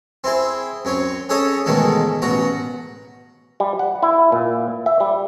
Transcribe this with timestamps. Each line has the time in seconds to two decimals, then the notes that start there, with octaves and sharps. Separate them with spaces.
0.24 C4 E4 G#4
0.85 F#2 C4 C#5
1.29 C#4 G#4 A4 C#5 D#5
1.66 G#2 B2 D#3 E3 G#3 A3
2.22 A1 B2 F#4 A#5
3.60 G3
3.79 F#5
4.03 E4
4.32 A#2
4.86 E5
5.00 G3